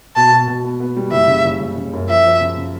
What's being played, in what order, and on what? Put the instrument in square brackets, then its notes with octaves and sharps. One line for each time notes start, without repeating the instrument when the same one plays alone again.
[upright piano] B2 [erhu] A5
[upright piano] B2
B2
B3
B3
G3
[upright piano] F#1 [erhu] E5
[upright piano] C#3
F#1
F#1
C#3
F#2
[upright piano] F3 [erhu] E5
[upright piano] F3
C#3
C#3